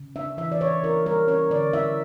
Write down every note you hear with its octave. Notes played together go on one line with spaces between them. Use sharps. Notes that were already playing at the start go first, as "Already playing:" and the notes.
Already playing: C#3
D4 E5
E3 E5
D5
C#3 C#5
E4 A#4
G3 A#4
C#4 C#5
D3 D5
E4 E5